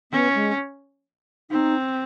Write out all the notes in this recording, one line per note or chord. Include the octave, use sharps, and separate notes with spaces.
B3 C#4
G#3
C4 D#4